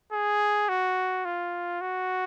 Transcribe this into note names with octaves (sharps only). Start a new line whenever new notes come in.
G#4
F#4
F4
F#4